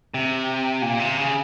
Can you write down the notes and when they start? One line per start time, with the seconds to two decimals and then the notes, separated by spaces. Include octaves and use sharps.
0.14 C3
0.82 A#2
0.99 C3
1.17 C#3